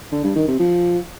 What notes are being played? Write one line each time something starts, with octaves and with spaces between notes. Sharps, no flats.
D3
G2
D#3
C3
F3